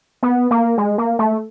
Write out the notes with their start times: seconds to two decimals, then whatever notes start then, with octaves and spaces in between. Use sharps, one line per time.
0.23 B3
0.51 A#3
0.78 G#3
0.98 A#3
1.19 A3